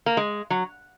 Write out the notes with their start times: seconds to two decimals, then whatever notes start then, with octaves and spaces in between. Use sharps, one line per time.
0.06 A#3
0.17 G#3
0.50 F#3